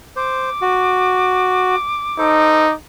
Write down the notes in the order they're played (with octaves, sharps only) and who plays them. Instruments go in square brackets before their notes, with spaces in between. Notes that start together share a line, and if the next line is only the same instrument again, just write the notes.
[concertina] C5 [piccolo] D6
[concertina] F#4
[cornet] D#4 [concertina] A4 C5